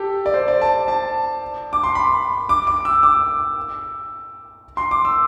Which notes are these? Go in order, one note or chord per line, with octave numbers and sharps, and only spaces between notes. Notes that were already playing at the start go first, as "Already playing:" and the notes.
Already playing: G4 A4
D5
C5
D5
A5
A5
D6
C6
B5
D6
D6
E6
D6
C6
D6
E6